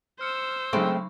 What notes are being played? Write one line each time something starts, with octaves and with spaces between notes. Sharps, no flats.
C5 E6 F6 C#7
C#3 F#3 G#3 A3 C4 B5 C#6